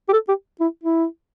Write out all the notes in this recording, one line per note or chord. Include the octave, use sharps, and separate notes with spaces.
G4
A4
G4
E4
E4